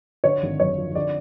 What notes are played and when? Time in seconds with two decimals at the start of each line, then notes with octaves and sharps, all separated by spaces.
0.24 D3 C#5
0.42 G#1
0.60 F#2 C#5
0.78 F3
0.95 D3 D5